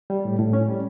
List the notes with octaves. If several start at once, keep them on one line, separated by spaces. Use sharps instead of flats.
G3
A2
A2
C#4
G3